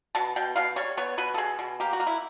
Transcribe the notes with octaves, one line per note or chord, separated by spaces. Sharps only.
B2 A5
B2 G5
B2 F5
G3 C#5
B3 C#5
B2 B4
A4
B2 G#4
B2
A#3 G4
F#4
A#3
E4